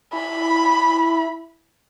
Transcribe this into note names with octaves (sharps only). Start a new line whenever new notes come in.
E4 B5